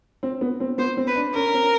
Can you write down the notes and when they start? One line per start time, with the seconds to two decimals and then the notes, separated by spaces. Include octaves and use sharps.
0.23 C4
0.41 B3
0.60 C4
0.78 B3 C5
0.97 C4
1.07 B4
1.16 D4
1.34 C#4 A#4
1.54 C4